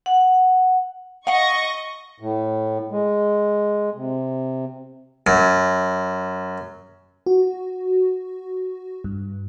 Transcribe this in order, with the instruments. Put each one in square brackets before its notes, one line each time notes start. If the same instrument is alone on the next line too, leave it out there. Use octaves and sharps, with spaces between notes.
[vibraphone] F#5
[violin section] D#5 C#6 A#6 [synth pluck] F5 F#5
[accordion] A2
G#3
C3
[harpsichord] F#2
[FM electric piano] F#4
G2